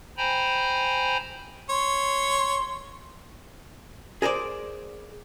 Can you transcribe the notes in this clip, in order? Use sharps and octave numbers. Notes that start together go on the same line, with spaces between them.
C5 G5 G#5 A#5 B5
C#5 C6
G#4 A#4 C5 D5